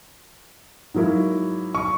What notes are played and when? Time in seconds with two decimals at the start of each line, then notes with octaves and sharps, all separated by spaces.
0.94 G#2 F#3 A#3 E4
1.75 C#6